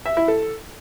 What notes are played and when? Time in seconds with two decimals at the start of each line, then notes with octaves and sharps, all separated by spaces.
0.05 E5
0.17 E4
0.28 A4